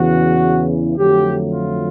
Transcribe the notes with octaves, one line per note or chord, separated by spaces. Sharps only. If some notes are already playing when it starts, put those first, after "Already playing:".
Already playing: E2 C#3 E3 F#4
F2 D3 F#3 A3 G4
F4